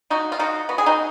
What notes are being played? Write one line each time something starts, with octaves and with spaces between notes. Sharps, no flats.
F3 D#4 F#4
F4
F3 D#4 F#4
B3 F#4
G#4
D#4 F#4